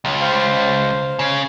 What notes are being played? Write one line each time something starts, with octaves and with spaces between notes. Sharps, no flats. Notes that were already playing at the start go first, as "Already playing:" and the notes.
C#2
C5 F5
C#3 C#5